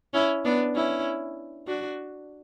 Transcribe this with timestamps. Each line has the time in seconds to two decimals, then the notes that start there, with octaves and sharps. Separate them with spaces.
0.14 C#4 E4
0.45 B3 D4
0.75 C#4 E4
1.67 D4 F#4